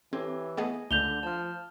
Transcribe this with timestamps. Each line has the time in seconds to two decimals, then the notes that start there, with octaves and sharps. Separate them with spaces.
0.13 E3 C4 G4 A4 C#5
0.57 A3 B3 G#4 D#5 G#5
0.91 C#2 D3 A3 G6 F7 G7
1.23 F3 A5 F6